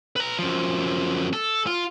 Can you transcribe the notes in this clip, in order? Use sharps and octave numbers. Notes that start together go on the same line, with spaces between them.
B4 A#5
F#2 F3
A4
F4